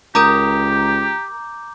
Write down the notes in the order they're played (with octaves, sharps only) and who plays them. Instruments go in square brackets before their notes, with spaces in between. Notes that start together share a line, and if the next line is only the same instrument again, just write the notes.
[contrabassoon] C#2 [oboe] G4 [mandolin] A#4 D#6 [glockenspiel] A#5 D6 G6